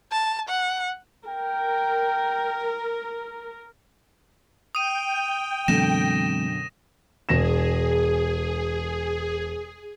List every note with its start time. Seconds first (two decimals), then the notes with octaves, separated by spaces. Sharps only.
0.12 A5
0.49 F#5
1.28 A#4 G5
4.75 G5 D#6 D#7
5.68 F#2 B2 D3 E3 G#3 C4 A#6 E7
7.29 E1 G#4 A#6 E7